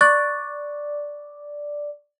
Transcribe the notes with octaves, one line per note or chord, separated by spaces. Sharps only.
D5 C#6 F#6 A6